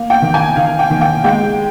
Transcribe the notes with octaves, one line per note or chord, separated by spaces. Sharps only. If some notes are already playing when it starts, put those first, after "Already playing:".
Already playing: A#3
G5
D#3
G#5
D#3 F5
G5
D#3
G5
G#3 G5